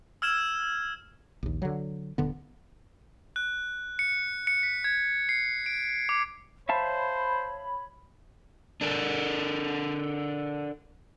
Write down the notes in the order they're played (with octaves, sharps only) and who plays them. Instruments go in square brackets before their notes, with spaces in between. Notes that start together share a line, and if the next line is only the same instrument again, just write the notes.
[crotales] E6 F6 G#6 E7
[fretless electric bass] A#1 D#2
D3 F#3
D#1 D3 B3
[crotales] F#6
C#7
C#7
B6
G#6
C7
D7
D6
[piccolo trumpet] C5 [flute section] C#5 B5 [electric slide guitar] E5 F5 A5
[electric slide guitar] D4 A4 A#4